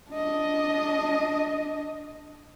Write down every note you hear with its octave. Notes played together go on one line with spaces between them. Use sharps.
D4 D#5